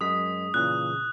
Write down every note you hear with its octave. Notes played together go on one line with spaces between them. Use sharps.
F#2 G#3 D#6 B6
A#2 C#3 E3 F#6